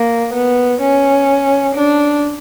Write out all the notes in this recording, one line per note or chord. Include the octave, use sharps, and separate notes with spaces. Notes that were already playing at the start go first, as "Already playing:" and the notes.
Already playing: A#3
B3
C#4
D4